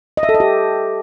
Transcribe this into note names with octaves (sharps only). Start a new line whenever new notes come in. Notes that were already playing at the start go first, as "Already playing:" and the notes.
D#5
E5
A4
D#5
G4